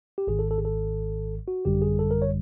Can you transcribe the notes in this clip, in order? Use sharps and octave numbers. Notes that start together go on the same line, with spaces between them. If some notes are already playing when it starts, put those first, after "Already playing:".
G4
G#1 G#2 D#3 G#4
A4
A4
G#4
A4
F#4
G#1 F#2 D3 G3 G4
G#4
A4
A#4
C#5